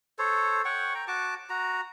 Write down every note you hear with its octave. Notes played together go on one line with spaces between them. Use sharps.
A4 C5 C#5
C#5 F#5 G5 C#6
G5 A#5
F#4 A5 D6
F#4 A#5